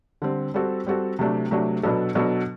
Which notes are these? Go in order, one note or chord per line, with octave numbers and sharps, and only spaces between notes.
D3 G3 C4
G3 C4 F#4 A4
G3 C4 F#4 A4
C3 F#3 A3 D4
C3 F#3 A3 D4
B2 F#3 B3 D4 A4
B2 F#3 B3 D4 A4